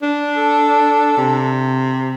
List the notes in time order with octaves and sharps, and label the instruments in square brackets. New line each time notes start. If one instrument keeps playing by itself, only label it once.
[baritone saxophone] D4
[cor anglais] A4
[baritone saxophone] C3